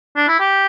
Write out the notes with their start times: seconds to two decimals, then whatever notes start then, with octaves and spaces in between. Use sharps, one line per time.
0.17 D4
0.28 E4
0.40 G4